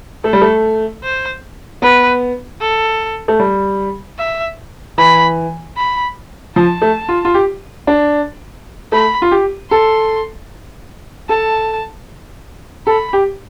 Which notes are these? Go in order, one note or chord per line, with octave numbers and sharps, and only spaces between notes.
A3 A4
G3
A3
C5
B3 B4
A4
A3
G3
E5
E3 B5
B5
F3 A5
A3
F4
F4
G4
D4
A3 B5
F4
G4
A4 C6
A4 A5
A4 B5
G4